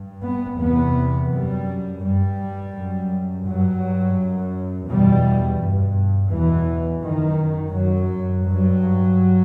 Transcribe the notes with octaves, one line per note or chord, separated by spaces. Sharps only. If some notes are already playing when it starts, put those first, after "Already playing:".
Already playing: G2
B3
E2 C3 B3
F#2 G3
G2 G3
F#2
G2 F#3
F#2
E2 B2 G3
G2
E2 B2 E3
F#2 D#3
F#2 F#3
G2 F#3